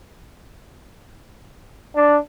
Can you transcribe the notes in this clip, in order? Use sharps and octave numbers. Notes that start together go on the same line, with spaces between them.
D4